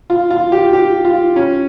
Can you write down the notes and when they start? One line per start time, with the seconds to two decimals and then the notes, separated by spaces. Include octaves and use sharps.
0.10 F4
0.30 F4
0.52 G4
0.73 G4
1.05 F4
1.36 C#4